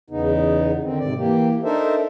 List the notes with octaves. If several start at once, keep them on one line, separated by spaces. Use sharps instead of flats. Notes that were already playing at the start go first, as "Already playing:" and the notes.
E2 C#3 B3 D#4
D3 D#3 C4
G#2 C3 D5
E3 A#3 G4
D4 D#4 A4 A#4 C5 E5